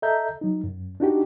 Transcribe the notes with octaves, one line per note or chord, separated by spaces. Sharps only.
A4 D#5 E5 A#5 G6
F#3 D#4
F#2
D4 D#4 F#4 G4